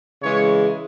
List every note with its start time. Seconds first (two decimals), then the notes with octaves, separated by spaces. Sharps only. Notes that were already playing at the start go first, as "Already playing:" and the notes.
0.21 C#3 E3 G#3 C#5